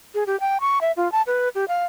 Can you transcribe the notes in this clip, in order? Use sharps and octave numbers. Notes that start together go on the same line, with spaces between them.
G#4
G4
G5
C#6
E5
F4
A5
B4
G4
F5